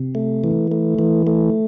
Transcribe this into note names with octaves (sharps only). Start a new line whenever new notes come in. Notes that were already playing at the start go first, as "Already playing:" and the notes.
Already playing: C3
A3
E3
A3
E3
A3